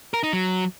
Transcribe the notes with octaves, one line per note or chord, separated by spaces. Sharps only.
A#4
D#4
F#3